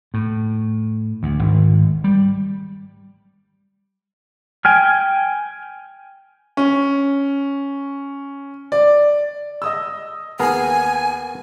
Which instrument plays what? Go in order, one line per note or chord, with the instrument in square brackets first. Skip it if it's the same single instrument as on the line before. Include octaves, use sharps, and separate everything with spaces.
[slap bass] A2
D2
G#1
G3
[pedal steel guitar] G5 G#5 F6
[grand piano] C#4
D5
[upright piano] D#5 D#6 E6
[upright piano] D#2 G#4 [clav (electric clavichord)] B3 A#4 [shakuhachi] G#5